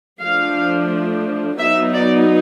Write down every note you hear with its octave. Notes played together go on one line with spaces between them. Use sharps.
F3 A3 D4 F5
F#3 B3 D#4 E5
D5